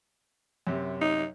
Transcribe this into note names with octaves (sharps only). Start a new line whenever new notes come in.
F#2 C3
D#4